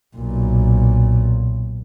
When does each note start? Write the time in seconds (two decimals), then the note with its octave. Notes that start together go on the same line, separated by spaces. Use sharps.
0.16 B1 A#2